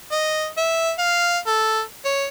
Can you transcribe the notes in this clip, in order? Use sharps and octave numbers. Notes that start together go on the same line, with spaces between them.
D#5
E5
F5
A4
C#5